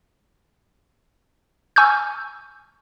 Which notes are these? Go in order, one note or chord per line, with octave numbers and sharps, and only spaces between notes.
G#5 C#6 E6 F6 G6